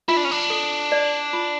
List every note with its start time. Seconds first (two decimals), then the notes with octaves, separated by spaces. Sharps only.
0.08 E4 F4
0.17 D4
0.25 C#4
0.31 D4
0.50 A4
0.92 D5
1.33 F4